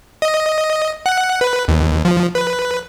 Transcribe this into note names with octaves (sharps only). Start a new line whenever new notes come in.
D#5
F#5
B4
D#2
F3
B4